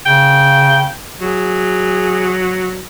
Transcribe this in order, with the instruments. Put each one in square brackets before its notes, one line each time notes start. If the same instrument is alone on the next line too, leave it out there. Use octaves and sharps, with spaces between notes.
[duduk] C#3 [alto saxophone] G5
[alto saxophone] F#3 [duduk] G#4